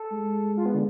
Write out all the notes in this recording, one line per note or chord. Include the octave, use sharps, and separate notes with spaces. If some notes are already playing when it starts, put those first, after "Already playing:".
Already playing: A4
G#3
F4
B3
D3